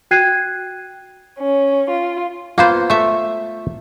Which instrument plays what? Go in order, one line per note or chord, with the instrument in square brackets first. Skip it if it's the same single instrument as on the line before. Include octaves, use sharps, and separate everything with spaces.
[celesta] F#4 G5 F#6 G#6 C7 D#7
[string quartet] C#4
F4
[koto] A#3 B3 C5 [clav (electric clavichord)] F4
[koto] A3 E5